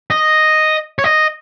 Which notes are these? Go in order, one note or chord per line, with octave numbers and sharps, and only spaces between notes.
D#5
C#5
D#5